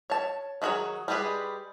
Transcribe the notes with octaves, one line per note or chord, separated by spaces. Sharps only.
C#5 A5
D#3 F#3 F#4 G#4 C#5
G3 G#3 G4 G#4 B4